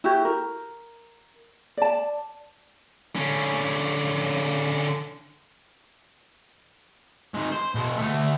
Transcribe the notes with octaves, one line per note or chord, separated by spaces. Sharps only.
E4 F#4 G4
A#4
D5 A5
D3 C#4
D#3 G#3
C5
B2 G#3
D2 A3